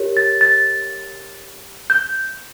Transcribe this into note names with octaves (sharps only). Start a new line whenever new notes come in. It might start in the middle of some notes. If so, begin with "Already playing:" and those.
Already playing: G4 A#4 C#5
A6
A6
G6